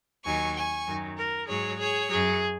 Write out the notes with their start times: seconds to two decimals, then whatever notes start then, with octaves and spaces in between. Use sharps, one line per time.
0.25 D#2 D#3 F#3 G#5 C#6
0.56 G#5 C#6
0.87 F#2 D#3 F#3
1.18 A#4
1.48 G#2 F#3 G#4 C#5
1.79 G#4 C#5
2.10 F#2 F#3 G#4